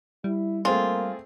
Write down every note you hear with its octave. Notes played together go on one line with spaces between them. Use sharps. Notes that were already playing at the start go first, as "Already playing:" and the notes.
G3 E4
A3 A#3 C4 F4 G#4